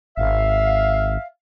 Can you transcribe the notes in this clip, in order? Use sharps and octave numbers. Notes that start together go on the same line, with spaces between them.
G#1 E5 F5